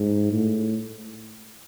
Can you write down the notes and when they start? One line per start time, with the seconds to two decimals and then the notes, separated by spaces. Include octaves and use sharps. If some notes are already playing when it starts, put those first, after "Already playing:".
Already playing: G#2
0.32 A2